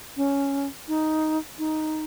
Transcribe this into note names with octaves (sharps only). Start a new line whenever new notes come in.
C#4
D#4
D#4